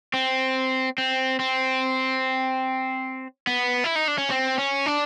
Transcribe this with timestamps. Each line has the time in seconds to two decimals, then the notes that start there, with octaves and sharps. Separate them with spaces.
0.14 C4
0.98 C4
1.39 C4
3.47 B3
3.84 E4
3.96 D#4
4.08 D4
4.18 C#4
4.31 C4
4.58 C#4
4.86 D4